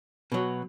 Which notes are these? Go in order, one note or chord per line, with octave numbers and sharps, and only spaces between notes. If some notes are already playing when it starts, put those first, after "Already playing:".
B2 F#3